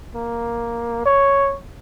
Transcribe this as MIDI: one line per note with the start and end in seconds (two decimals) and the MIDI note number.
0.15 1.04 58
1.06 1.57 73